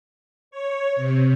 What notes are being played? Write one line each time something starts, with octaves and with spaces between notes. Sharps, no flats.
C#5
C3